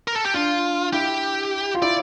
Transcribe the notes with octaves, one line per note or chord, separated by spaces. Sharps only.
A#4
A4
G4
D4 F4
E4 G4
F4
E4 D5